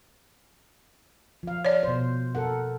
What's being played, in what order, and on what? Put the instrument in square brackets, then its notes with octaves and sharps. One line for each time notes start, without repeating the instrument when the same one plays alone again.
[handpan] F3 F5
[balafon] C#5 D5
[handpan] B2 C5
A4 A#4 F#5